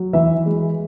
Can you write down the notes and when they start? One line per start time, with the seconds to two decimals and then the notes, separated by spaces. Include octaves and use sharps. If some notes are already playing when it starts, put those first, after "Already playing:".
Already playing: F#3
0.13 E3 E5
0.46 G#3